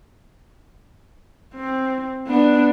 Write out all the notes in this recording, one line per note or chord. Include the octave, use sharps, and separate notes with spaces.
C4
B3 D4